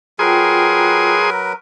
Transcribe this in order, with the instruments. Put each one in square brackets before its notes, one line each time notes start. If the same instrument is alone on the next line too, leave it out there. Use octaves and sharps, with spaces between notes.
[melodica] F#3 A#4 B4 [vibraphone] F4 G5 [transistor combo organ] G#4 C6 D#6